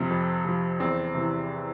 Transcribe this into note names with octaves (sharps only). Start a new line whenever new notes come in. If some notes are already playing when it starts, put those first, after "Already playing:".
Already playing: F2 C3 F3 C4
F2
C3 F3
E2 C4
C3 E3